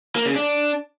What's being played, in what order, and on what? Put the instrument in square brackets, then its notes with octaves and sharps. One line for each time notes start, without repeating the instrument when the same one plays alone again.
[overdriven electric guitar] A#3
C#3
D4